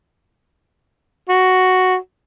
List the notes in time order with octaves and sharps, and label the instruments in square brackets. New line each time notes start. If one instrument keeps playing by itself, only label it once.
[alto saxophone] F#4